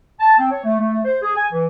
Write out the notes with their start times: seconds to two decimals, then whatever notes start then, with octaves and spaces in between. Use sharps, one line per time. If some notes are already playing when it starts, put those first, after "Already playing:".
0.20 A5
0.38 C4
0.51 C#5
0.64 A3
0.79 A3
1.04 C5
1.22 G#4
1.35 G#5
1.52 E3